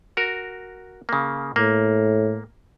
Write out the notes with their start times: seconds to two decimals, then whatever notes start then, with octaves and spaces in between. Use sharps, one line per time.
0.17 F#4 A#4
1.09 C#3 A#3
1.56 A2 A#3